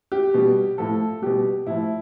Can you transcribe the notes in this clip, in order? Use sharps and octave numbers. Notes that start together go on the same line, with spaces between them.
G4
B2 G3
A2 F3 A4
B2 G3 G4
A2 F3 E4